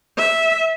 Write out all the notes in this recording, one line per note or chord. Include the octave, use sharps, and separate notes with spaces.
E5